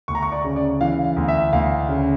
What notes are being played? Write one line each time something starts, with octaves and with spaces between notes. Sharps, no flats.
D2 C#6
A#5
C#6
D5
C#3
D5
E3 F5
F5
D2
E5
D2 F5
C#3